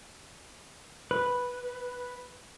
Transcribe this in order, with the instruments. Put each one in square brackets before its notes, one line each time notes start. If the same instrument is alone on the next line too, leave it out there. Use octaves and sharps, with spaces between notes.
[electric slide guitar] B4